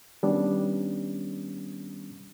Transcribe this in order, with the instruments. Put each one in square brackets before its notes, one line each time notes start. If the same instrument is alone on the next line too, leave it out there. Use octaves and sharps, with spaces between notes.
[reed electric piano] D#3 G3 B3 C#4 D4